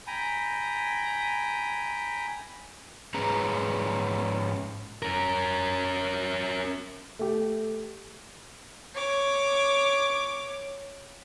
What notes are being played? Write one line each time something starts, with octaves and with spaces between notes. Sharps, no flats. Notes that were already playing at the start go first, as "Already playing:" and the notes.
G5 G#5 A#5 B5
G#2 C#4 G#4 B4 C#5 A#5
C#4 A#4
A3 G4
C#5 D6